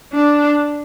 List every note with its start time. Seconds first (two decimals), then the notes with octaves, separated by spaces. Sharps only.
0.13 D4